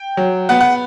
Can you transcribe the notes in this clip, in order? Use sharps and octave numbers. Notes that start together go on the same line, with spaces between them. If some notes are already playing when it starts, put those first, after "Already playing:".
Already playing: G5
F#3
B3 F#5
F#5